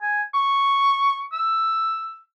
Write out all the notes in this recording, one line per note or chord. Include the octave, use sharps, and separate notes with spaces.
G#5
C#6
E6